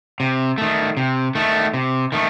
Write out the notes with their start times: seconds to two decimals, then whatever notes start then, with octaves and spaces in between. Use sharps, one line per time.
0.20 C3
0.58 D#3 A3
0.97 C3
1.35 D#3 A3
1.74 C3
2.12 D#3 A3